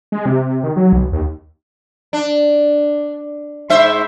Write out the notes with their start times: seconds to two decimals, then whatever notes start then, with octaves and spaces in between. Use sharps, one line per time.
0.12 G#3
0.26 C3
0.64 D#3
0.77 F#3
0.93 B1
1.12 D#2
2.13 D4
3.70 G#2 C5 E5